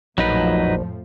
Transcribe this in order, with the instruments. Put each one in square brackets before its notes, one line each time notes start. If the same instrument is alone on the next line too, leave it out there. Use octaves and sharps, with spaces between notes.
[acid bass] A#1 [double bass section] F2 A2 F3 [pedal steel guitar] F#3 D#4 B4